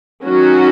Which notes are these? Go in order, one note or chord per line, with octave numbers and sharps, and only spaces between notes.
D#3 F#3 C#4 F#4